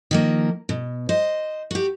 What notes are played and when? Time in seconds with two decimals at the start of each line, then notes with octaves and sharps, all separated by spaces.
0.11 D#3 F3 A#3
0.69 B2
1.09 C5 D#5
1.71 F#4 G4